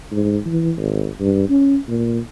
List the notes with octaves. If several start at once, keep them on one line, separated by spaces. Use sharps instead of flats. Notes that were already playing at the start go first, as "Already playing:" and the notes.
G#2
E3
G#1
G2
C#4
A#2